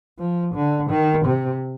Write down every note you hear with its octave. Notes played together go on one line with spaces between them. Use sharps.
F3
D3
D#3
C3